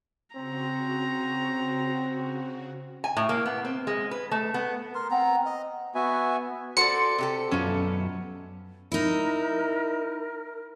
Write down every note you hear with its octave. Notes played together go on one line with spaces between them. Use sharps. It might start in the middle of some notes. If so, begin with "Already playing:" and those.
C#3 C4 F#4 A#5
G#5
A2
A#3
B3
C4
G#3
B4
A3
B3
A#4 C6
B3 C4 A#5
D#5
B3 F#4 E5 G#5
F#4 A4 C5 D5 C6 C#7
C3 G4 A4
F#2 B3 C#4 F4 A4
D#4 E4 A#4